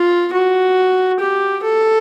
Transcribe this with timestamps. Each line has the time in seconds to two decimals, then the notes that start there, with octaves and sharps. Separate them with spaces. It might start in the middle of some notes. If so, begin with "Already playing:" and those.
Already playing: F4
0.33 F#4
1.20 G4
1.63 A4